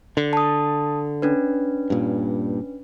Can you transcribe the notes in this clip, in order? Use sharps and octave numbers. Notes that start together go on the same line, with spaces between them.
D3
A5 D#6
C#4 D4 B4
G2 A#2